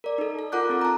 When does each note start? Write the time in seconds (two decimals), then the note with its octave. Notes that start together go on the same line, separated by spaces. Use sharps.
0.04 A#4 D5
0.18 D#4 A4
0.39 A4
0.52 F4 A#4 F#5 D6 F#6 G6
0.69 C4 A4
0.81 A5 A#5